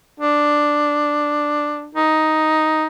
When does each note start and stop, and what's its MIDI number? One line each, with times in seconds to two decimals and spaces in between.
0.20 1.89 62
1.95 2.87 63